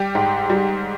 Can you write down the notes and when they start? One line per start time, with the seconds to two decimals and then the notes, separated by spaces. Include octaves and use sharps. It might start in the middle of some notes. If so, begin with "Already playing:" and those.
Already playing: G3 G4
0.15 G#2
0.50 G3